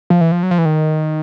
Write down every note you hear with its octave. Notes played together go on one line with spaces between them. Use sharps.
F3
E3
F3
F#3
F3
E3
D#3